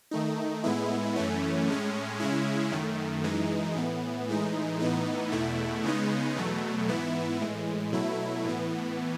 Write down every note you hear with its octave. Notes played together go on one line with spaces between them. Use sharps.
D#3 A3 D#4
A2 G#3 B3 E4
F#2 E3 A3 C#4
A2 G#3 C#4
C#3 G#3 C#4 E4
F#2 D#3 A3
F#2 E3 G#3 D#4
A2 E3 B3
A2 E3 G#3 D#4
A2 E3 B3 D#4
E2 B2 A3 E4
C#3 G#3 B3 D#4
E2 B2 F#3 A3
G#2 E3 B3 E4
A2 E3 G#3
B2 F#3 A3 E4
A2 E3 B3